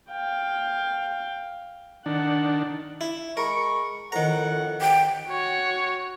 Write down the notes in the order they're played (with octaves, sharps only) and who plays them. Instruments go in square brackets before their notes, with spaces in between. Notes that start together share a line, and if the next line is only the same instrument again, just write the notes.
[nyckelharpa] F5 G5
[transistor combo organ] D#3 D4 [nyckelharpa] F#5
[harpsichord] E4
[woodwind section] G#3 B5 C#6 [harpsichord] A#4
[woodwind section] F2 A2 F#5 [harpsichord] D#3 A#5
[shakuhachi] G5
[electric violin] F#4 C#5